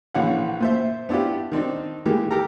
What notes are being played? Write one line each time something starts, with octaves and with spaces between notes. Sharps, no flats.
A#1 D3 E3 C#4 F5 F#5
A#2 C5 E5
B3 D4 E4 F4 G4
D#3 C4 D4 D#4
D#3 E3 G#3 A#3 G4
G4 A4 A#4 A#5